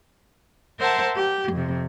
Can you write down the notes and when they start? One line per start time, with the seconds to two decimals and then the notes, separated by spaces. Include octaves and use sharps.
0.79 A#4 C5 E5 F#5 A5
1.15 G4
1.51 F2 C3